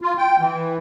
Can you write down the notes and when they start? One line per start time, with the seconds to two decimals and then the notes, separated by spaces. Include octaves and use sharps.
0.02 F4
0.18 G5
0.40 E3